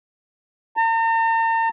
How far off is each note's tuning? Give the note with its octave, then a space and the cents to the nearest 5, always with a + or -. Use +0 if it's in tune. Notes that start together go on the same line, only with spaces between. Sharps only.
A#5 -45